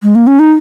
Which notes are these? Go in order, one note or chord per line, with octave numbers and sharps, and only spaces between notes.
G#3
A#3
C#4
D#4